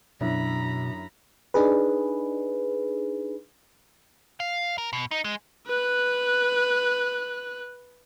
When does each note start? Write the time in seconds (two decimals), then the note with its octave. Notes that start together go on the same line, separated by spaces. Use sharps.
0.21 F#2 B2 D4 E4 A#5 B5
1.54 D4 D#4 G#4 B4
4.40 F5
4.78 A#4
4.93 B2
5.11 D#4
5.24 G#3
5.67 B4 F#6